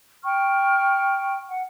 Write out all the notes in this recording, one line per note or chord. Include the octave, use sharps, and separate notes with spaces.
G5 C#6 F6
F#5